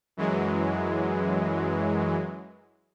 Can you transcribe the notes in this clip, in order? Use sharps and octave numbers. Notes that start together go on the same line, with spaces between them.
F#2 E3 F#3 G#3